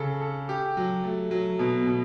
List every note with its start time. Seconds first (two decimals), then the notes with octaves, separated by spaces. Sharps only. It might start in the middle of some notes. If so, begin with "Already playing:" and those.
Already playing: C#3 A4
0.21 A4
0.49 G4
0.77 F#3
1.04 A3
1.31 F#3
1.59 B2
1.87 B2